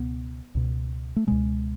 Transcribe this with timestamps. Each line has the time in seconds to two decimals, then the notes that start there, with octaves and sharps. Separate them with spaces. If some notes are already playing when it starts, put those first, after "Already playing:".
Already playing: C#2 B2 B3
0.55 C#2 B2
1.16 A3
1.27 C#2 B2 G#3